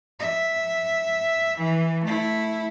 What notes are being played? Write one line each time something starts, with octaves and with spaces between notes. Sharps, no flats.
E5
E3
A3 E4